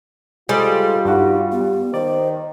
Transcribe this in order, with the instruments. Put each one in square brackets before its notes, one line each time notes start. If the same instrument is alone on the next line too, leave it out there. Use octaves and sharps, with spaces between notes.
[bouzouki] G3 [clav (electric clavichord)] G#3 G#4 C5 [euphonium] F4 [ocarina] A4
[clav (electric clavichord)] G2 F#4 [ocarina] D#4
[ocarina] B3
[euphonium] D#3 [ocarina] C5 [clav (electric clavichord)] D5